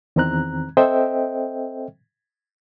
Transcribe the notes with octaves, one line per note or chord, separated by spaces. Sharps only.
E2 D#3 C4 A#5 F#6
C4 A4 C5 D#5 E5 G5